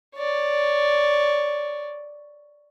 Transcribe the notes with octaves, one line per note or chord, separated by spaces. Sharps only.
C#5 D5